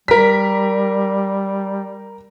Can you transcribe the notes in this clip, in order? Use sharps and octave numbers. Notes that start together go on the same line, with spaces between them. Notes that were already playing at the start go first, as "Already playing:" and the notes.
G3 A#4 B6